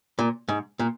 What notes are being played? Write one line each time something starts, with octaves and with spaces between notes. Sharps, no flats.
A#2
G#2
A#2